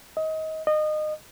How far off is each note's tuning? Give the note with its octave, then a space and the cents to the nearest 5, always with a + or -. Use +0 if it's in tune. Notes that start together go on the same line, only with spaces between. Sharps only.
D#5 +25
D#5 -25